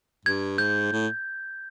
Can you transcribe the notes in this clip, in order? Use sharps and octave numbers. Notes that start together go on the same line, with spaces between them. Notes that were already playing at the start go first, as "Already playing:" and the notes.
G2 G#6
G#2 G6
A2